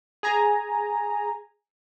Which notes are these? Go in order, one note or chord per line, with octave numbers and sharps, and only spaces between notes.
G#4 G#5 A#5